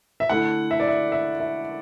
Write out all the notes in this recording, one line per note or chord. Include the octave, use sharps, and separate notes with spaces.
E5
D3 A3 E4 F#5
E5
D5
E5
E5
E5